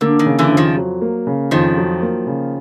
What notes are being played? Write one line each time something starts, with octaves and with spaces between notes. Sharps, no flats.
D3 A#3
D#3
C#3
D3 E3
F2
D#3 F3
F#3
A#3
C#3
F2 D#3 F3
F#3
A#3
C#3